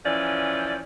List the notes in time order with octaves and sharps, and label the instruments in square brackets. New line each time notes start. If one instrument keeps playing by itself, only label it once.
[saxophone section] E3 F3 C#4 D5